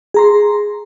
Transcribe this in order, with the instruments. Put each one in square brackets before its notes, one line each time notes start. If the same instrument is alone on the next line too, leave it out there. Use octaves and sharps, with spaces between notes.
[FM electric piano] G#4 A#5 C6